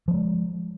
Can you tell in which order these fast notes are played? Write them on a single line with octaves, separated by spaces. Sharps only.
F3 A#3 G#3